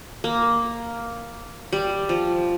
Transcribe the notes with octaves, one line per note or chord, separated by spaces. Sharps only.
A#3
G3
F3